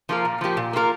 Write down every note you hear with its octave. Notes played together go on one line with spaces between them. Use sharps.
F3 A#3 F4 A#4
A#2
F3 A#3 G4
A#2
A#3 F4 A#4